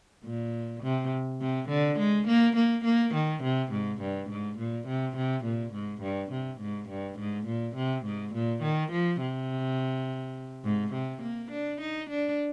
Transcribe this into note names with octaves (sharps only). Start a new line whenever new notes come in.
A#2
C3
C3
D3
G#3
A#3
A#3
A#3
D#3
C3
G#2
G2
G#2
A#2
C3
C3
A#2
G#2
G2
C3
G#2
G2
G#2
A#2
C3
G#2
A#2
D#3
F3
C3
G#2
C3
A#3
D4
D#4
D4